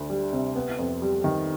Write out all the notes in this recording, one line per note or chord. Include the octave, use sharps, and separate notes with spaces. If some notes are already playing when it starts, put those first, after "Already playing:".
Already playing: D2 D4
G3
C3
B3
F2
G3
D#3